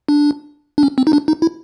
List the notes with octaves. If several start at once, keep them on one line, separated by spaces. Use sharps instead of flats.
D4
D4
C#4
C4
D#4
D4
D#4
E4